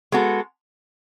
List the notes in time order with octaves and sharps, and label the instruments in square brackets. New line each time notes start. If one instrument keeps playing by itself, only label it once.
[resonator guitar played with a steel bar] G#3 B3 F#4 A4